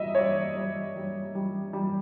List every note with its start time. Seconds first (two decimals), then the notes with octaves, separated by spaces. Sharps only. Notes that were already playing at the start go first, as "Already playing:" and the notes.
Already playing: G3 D#5 E5
0.15 C#5
0.18 G3 D5
0.57 G3
0.96 G3
1.35 G3
1.73 G3